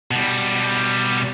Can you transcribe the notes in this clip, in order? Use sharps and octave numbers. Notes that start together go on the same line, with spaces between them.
B2 G3